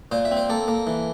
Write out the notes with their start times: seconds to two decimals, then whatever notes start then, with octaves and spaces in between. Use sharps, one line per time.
0.12 A#2 C5
0.25 E5
0.31 C4
0.37 C5
0.49 A#3 A4
0.68 A#3
0.87 E3